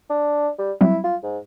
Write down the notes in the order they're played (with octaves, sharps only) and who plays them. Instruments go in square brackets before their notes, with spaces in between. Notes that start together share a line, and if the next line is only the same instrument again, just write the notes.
[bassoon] D4
G3
[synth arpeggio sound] F#3 G3 C4 [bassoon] E4
[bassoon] F4
G#2